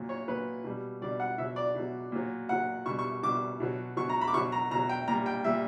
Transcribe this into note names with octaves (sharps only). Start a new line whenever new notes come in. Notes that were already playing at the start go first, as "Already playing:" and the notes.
Already playing: A#2 F#3
C#5
A#2 F#3 B4
B2 G3
B2 G3 D5
F#5
B2 F#3 E5
D5
B2 F#3
A#2 F#3
A#2 F#3 F#5
B2 G3 C#6
C#6
B2 G3 D6
B2 F#3
B2 F#3 C#6
A#5
B5
D6
B2 F#3 C#6
A#5
B2 F#3 A#5
G5
A#2 G3 A#5
G5
A#2 G3 E5